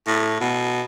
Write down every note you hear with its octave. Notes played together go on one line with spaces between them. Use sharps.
A2
B2